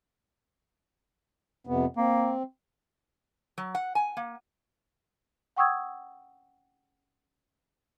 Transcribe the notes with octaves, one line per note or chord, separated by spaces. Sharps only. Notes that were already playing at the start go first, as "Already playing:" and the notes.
F2 C3 B3
A#3 C4
F#3
F#5
G#5
A#3
F#5 G5 C#6 D#6 E6 G#6